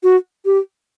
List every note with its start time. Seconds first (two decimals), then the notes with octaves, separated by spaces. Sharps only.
0.03 F#4
0.45 G4